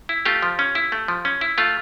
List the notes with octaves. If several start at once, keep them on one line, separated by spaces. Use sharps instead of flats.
E4
A3 F4 G4
F3
C#4
E4
A3
F3
C#4
E4
A3 F4